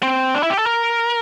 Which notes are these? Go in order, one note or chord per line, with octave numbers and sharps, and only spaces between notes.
C4
D4
E4
G4
A4
A#4